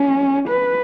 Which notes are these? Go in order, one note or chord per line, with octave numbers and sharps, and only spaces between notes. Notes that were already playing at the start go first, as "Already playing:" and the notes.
Already playing: C#4
B4